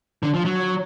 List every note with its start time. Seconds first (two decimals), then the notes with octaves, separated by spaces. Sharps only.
0.23 D3
0.34 F3
0.45 F#3